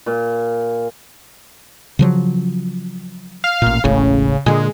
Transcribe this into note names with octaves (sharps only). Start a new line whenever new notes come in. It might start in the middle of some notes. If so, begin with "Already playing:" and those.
A#2
C#3 F3 F#3
F5
A1 A#2
E1 A1 A2 C#3
A#2 D3 G#3